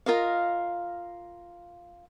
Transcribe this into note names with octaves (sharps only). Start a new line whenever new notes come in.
F4 A#4 D#5 F5